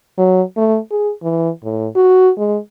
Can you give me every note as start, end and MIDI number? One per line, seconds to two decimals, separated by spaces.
0.18 0.42 54
0.57 0.79 57
0.91 1.12 68
1.23 1.50 52
1.64 1.88 45
1.95 2.30 66
2.38 2.58 56